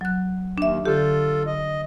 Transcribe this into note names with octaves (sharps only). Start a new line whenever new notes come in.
F#3 F#6
D#2 D4 E5
D3 F4 G4 A4
D#5